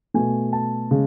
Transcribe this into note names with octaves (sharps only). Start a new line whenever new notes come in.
B2 A3 G#5
A5
C#3 G#3